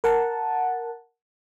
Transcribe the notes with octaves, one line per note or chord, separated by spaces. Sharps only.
A#4 F#5 A5